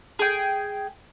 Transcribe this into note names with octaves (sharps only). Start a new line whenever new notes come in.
G#4 G5